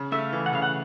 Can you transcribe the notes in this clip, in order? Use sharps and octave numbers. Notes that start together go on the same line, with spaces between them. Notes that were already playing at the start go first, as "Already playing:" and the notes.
Already playing: C#3
A3 E5
F5
E3
F#5
C#3 F5
F#5